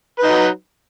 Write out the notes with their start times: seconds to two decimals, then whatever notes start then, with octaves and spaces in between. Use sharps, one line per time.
0.19 B4
0.23 D#4
0.28 F#3